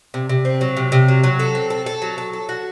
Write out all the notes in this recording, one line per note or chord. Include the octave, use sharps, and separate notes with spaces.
C3
C3
C4
F#3
C3
C3
F#3
F#3
A4
C4
A4
A4
F#3
A4
A4
F#4